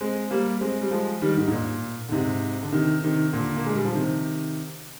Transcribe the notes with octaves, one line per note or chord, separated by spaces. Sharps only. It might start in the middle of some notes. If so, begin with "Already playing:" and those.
G#3 C4
G3 A#3
G#3 C4
G3
F3 G#3
D#3 G3
G#2
G#2
A#2
D3
G#2 C3
D3
C3 D#3
C3 D#3
A#2 D3
A#3
G#3
G3
F3
C3 D#3